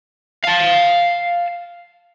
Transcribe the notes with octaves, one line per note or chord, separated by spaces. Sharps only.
F5 A5